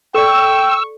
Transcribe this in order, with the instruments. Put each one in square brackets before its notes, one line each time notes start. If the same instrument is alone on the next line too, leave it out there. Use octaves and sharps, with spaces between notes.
[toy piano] A4 D5 [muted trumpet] G5 [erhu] C#6 [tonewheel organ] E6